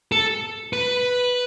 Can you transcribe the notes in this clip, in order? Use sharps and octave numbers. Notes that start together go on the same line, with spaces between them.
A4
B4